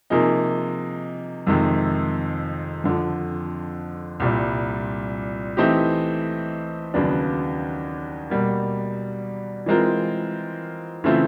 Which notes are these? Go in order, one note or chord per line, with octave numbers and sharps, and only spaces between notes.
C3 F3 A#3 D#4 G#4
F2 C3 D#3 G#3
F2 D3 F3
C2 A#2 G3
E3 A3 C4 D#4 G4
D#2 C#3 F#3 B3 D4
B2 G3 A#3
E3 G#3 C4 F4 A#4
C#3 E3 A3 C4 F4